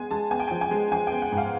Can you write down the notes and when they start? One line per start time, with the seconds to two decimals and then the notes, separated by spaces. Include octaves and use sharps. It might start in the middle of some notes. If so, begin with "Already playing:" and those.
Already playing: G#3 B3 G#5
0.11 G#3 A5
0.31 B3 G#5
0.40 G5
0.48 G#5
0.51 F3
0.61 G#5
0.71 G#3
0.92 F3 G#5
1.07 G5
1.12 B3
1.22 F#5
1.32 G#2
1.38 F5